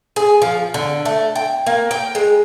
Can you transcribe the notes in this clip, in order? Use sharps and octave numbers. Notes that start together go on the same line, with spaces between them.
G#4
F3
D3
A3
G5
A#3
G5
G#3